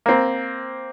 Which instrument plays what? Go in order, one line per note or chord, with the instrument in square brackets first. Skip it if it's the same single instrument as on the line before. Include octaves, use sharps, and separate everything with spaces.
[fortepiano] A#3 C4